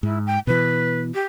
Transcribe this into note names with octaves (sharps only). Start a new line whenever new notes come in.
G#2 E4
G5
B2 E3 B4
G4